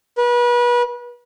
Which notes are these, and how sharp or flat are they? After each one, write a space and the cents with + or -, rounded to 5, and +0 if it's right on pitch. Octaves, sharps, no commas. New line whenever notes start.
B4 -35